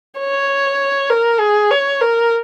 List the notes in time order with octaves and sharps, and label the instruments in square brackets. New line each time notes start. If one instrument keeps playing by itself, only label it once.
[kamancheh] C#5
A#4
G#4
C#5
A#4